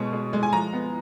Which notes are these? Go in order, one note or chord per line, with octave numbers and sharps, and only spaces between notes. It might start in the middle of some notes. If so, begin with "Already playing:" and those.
Already playing: B2 G#3 B3 C#5
G#3
G#3
G#5
F3 A#5
B3